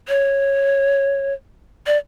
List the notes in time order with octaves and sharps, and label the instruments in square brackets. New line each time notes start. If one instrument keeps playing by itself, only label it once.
[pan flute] C#5
D5